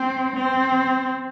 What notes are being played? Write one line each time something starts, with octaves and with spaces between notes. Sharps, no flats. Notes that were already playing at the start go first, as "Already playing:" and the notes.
Already playing: C4
C4